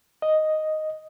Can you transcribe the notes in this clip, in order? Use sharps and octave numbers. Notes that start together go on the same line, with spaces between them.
D#5